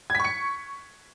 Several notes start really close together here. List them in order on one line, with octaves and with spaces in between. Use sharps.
G#6 B6 C#6 C#7